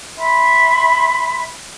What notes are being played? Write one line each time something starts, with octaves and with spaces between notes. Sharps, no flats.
E5 B5 C6